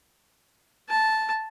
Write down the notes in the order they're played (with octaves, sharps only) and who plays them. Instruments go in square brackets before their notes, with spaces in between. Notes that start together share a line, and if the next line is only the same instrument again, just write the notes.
[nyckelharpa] A5